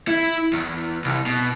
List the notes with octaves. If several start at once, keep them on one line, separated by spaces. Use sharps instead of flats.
E4
E2
C2
B2